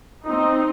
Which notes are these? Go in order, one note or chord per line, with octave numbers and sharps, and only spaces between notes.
C4 D#4